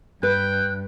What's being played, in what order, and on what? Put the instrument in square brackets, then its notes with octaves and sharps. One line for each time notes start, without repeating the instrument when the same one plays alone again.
[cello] G2 [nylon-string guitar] B4 [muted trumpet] G5 [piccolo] F#6